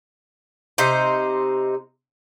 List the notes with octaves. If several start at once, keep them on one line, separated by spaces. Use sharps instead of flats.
C3 D#4 C5